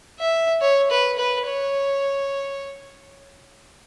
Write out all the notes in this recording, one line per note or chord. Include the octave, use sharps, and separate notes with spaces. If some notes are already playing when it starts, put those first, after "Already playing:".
E5
C#5
B4
B4
C#5